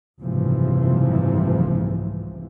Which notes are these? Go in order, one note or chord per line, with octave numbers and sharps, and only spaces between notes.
F#1 C2 G#2 C3 E3 F3